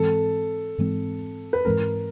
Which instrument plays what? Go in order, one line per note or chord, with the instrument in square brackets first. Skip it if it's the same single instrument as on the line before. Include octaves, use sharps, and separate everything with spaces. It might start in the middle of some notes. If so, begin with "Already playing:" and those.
Already playing: [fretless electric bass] G#2 E3 G#3 C4 [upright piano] A4
[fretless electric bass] G#2 E3 G#3 C4
[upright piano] B4
[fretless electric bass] G#2 E3 G#3 C4 [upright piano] A#4